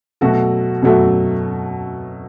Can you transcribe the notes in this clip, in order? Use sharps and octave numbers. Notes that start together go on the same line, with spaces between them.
B2 F#3 A3 F#4 A4
B2 F#3 A3 F#4 A4